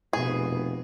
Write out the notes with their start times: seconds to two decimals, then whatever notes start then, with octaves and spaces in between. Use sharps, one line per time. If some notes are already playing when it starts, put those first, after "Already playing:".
0.13 F1 B2 G#4